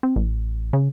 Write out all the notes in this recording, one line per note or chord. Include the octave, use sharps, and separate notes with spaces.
C4
A1
C#3